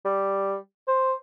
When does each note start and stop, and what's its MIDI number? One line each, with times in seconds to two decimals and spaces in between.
0.05 0.56 55
0.88 1.14 72